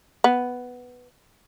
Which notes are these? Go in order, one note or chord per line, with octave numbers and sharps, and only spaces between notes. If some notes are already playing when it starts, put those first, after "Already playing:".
B3